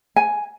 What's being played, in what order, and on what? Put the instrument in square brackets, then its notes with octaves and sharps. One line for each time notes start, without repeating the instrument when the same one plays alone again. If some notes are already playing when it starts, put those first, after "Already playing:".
[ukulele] G#5